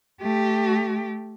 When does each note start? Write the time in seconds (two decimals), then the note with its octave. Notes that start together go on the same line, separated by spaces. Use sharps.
0.22 A3 G4